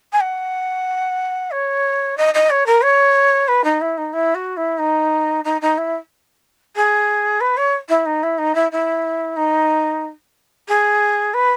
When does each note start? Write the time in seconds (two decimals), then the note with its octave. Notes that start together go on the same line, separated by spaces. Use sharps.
0.12 G#5
0.20 F#5
1.51 C#5
2.17 D#5
2.34 D#5
2.50 C#5
2.66 A#4
2.83 C#5
3.48 B4
3.64 D#4
3.81 E4
3.97 D#4
4.13 E4
4.34 F#4
4.57 E4
4.78 D#4
5.44 D#4
5.61 D#4
5.77 E4
6.76 G#4
7.40 B4
7.57 C#5
7.89 E4
8.06 D#4
8.23 E4
8.38 D#4
8.55 E4
8.71 E4
9.36 D#4
10.68 G#4
11.34 B4